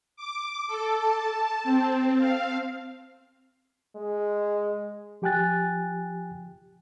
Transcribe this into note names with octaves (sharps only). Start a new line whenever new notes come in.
D6
A4
A5
C4
F5
G#3
F3 G4 G5 G#5 F#6 A6